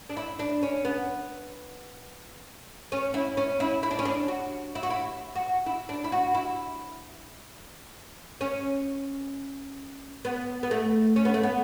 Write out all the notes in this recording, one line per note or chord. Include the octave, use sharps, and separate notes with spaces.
D4
E4
D4
C#4
B3
C#4
E4
C#4
E4
E4
D4
C#4
D4
F#4
E4
F#4
E4
F#4
E4
D4
E4
F#4
E4
C#4
B3
B3
A3
C#4
B3
A3
B3